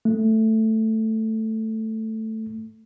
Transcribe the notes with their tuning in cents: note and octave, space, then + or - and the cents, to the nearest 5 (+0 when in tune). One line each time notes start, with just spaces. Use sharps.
A3 +5